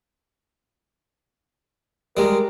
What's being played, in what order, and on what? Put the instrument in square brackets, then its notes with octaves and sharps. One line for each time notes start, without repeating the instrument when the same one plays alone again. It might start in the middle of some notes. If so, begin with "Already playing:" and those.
[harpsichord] G3 G#3 [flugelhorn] A#4